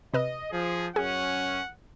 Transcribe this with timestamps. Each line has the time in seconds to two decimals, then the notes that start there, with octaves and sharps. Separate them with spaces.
0.14 C3 B4 D#5 E6
0.52 F3 G#4
0.96 F#2 C#4 G#4 F#5